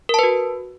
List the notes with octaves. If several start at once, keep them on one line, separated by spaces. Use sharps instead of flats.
F#4 A#4 B4 A5